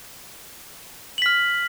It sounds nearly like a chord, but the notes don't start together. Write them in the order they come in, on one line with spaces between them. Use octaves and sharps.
F#7 B6 F6